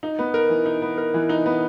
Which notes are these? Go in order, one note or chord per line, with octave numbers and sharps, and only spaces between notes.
D#4
B3
A#4
E3
D#4
B3
A#4
E3
D#4
B3